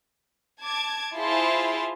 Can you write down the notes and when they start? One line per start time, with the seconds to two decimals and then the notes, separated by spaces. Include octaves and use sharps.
0.61 A5 D6 G#6
1.17 E4 F4 G#4 C5 A5 C6